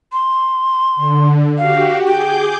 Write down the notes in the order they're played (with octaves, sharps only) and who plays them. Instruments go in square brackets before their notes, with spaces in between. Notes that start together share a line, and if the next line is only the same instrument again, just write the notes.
[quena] C6
[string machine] D3
[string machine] F#4 G4 [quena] F5
[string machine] G#4 D6 G6 [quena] G5